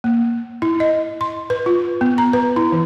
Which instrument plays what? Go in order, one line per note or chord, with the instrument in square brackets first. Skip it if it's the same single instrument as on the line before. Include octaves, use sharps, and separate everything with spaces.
[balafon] A#3
E4
D#5
C6
B4
F4
B3
A#5
B4
E4
E3